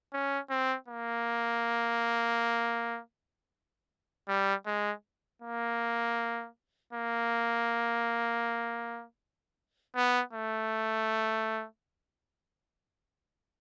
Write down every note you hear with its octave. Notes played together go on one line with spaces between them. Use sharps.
C#4
C4
A#3
G3
G#3
A#3
A#3
B3
A3